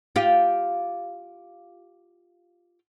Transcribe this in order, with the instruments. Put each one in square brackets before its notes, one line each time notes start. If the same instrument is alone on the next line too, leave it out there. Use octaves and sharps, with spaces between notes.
[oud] F4 G4